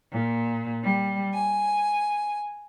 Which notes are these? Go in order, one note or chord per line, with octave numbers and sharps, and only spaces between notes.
A#2
G3
G#5